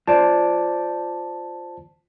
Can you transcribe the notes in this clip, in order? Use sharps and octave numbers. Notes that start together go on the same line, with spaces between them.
F4 C5 D5 A5